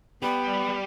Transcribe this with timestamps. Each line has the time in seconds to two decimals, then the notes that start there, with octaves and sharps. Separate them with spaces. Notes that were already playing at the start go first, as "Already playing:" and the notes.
0.22 G3 B3 G4 B5